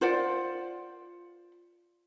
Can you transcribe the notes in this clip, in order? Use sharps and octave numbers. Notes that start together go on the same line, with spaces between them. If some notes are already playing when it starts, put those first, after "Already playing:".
F4 C5 D5 F#5